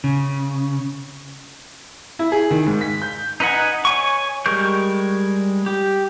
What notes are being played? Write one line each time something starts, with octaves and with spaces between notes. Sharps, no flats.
C#3
E4
G#4
D#3
G#2
B6
G6
D#4 B4 D#5 F#5 G#5
C#5 G#5 C#6
G3 G#3 A#4 C#6 G6
G4